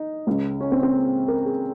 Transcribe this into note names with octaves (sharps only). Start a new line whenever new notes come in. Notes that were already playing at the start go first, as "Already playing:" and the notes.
Already playing: D#4
C#2 C#3
C#4
C4
C4
A#4
G#4